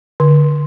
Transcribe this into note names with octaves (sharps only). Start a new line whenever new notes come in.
D3